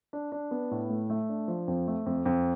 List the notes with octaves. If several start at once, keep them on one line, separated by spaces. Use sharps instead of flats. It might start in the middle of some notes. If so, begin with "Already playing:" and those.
D4
D4
B3
A2
A3
A3
D4
F3
F2
A3
F2
F2